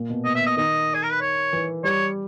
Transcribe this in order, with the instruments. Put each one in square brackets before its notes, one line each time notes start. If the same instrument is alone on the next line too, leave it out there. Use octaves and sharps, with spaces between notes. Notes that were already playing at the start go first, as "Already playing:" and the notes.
Already playing: [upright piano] A#2
B2
[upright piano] B2 [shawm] D#5
[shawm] E5
[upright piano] B2
[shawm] D#5
[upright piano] D#3 [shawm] D#5
[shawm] G#4
A#4
B4
C#5
[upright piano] E3
[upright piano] G3 [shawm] C#5